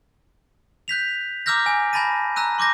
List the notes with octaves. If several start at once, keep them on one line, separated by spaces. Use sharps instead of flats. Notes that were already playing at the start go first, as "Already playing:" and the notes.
F#6 G6 B6 F7
A#5 D6 E6 F6 G6 A#6
G#5
G#5 A5 B5 A6 A#6 D#7
A#5 E6 F#6 D#7
C6 D6 G6 A#6